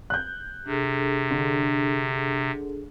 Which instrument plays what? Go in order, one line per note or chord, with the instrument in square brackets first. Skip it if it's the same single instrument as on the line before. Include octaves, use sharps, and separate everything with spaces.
[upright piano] F#6 G6
[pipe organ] C3 [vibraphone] D4 G#4 A4
[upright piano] D3